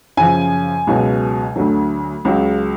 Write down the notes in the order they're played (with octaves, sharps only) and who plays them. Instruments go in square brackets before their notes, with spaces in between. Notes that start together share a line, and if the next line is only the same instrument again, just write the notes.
[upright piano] F#2 C#3 F3 G#5
C#2 B2 F#3
D2 D3 F#3
C#2 C#3 F#3